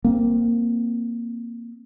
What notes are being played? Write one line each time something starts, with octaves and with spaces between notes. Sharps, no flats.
A#3 C4